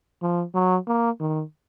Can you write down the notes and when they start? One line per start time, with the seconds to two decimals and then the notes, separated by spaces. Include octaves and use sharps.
0.22 F3
0.54 F#3
0.87 A#3
1.20 D#3